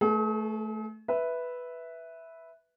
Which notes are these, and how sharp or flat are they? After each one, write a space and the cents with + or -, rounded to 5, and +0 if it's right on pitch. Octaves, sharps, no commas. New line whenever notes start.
A3 -5 G#4 +45 B4 -40
B4 +0 E5 -5